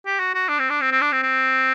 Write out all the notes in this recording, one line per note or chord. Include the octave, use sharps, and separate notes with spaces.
G4
F#4
F#4
D4
C4
D4
C4
C4
D4
C4
C4